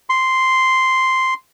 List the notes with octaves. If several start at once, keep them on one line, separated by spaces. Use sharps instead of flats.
C6